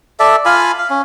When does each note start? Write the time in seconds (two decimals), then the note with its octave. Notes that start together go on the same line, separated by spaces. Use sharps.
0.20 A4 D5 E5
0.45 F4 F5 G#5 B5
0.78 F5
0.90 C#4